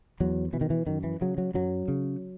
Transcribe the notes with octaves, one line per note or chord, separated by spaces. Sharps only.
E2 F#3
B2 E3
D#3
E3
F#2 D#3
E3
C#3 F#3
F#3
F#2 F#3
C#3